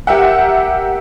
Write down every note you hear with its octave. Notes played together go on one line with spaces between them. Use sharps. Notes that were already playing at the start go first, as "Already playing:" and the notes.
G4 A#4 E5 F#5